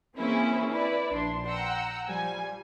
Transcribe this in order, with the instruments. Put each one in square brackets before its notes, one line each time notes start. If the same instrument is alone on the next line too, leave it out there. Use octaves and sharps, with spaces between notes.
[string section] E3 A#3 C4 C#4 E4 G#4
E4 B4 D5
A#1 D4 C6
F#5 G5 A#5 E6
F3 G3 G#5